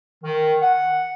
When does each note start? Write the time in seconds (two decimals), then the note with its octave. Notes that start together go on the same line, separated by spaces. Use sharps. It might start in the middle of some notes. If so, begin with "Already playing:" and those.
0.24 D#3
0.62 F#5